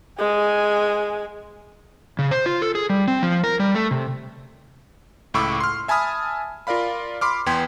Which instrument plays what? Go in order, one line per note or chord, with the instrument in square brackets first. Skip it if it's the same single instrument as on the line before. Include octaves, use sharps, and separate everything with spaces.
[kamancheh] G#3 G#5
[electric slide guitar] C#3
C5
F4
A4
G#4
G3
C4
F3
A#4
G3
A3
C3
[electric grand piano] C#2 A2 B5 C#6 D6 E6
C6 F6
E5 G#5 A5 B5 D#6 F6
F4 A#4 D5 F5 B5
B5 C6 D6 F6
E2 B3 G5 C6 G#6 B6